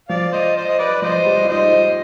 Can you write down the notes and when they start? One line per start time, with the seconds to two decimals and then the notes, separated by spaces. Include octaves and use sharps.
0.09 F3 D5 F5
0.32 C5 D#5
0.55 C5 D#5
0.69 D#5
0.78 B4 D5
1.02 F3 C5 D#5
1.26 G3
1.44 F4
1.48 D#4 C5 D#5
1.72 F4